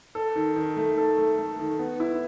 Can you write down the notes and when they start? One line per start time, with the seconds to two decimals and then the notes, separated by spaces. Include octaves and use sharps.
0.15 A4
0.35 D#3
0.56 D#3
0.77 A3
0.98 A4
1.17 A3
1.38 A3
1.59 D#3
1.79 B3
2.00 E4